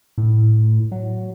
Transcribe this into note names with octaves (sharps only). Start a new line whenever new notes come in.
A2
F#3